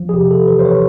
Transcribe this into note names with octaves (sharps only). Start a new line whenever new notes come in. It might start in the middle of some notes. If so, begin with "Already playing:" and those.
Already playing: F3
G#4
C3 G4
A4
E3 B4
C5
C#5